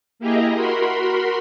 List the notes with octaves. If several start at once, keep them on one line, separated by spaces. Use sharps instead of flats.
A#3 E4 G4 G#4 D#5 A#5
F#4 A#4 B5 C6